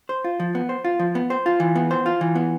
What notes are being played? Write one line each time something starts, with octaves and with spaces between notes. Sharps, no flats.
C5
F4
F3
B3
C5
F4
F3
B3
C5
F4
E3
B3
C5
F4
E3
B3